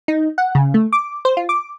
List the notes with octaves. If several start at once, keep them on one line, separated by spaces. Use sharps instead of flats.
D#4
F#5
C#3
A3
D6
C5
F4
D6